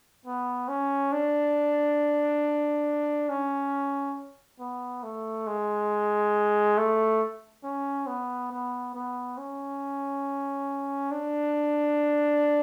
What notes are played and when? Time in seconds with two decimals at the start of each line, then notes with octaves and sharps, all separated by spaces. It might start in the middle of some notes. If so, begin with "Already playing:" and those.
0.26 B3
0.69 C#4
1.12 D4
3.29 C#4
4.60 B3
5.03 A3
5.47 G#3
6.78 A3
7.64 C#4
8.07 B3
8.51 B3
8.95 B3
9.38 C#4
11.11 D4